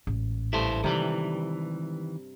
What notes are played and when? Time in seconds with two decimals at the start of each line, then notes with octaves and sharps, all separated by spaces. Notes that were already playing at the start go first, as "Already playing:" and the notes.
0.07 A1 G#2
0.53 G2 A3 E4 C5
0.84 C3 D#3 E3 G3 G#3